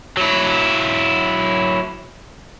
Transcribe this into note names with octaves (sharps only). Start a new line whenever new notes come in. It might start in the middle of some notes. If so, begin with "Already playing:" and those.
F#3 E4